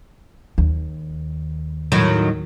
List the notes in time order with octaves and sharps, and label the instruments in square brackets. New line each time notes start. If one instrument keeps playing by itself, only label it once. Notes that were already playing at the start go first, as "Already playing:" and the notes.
[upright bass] D#2
[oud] A2 D#3 F#3